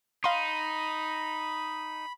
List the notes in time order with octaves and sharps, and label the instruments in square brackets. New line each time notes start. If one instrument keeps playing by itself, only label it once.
[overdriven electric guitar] D#4 [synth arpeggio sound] F5 C6 [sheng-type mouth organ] B5